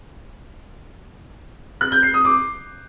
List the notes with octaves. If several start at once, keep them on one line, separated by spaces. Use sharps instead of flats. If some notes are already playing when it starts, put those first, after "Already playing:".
F#6
G6
C7
D#6
D6